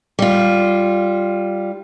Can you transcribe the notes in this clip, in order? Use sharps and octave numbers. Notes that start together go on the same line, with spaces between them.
G3 F4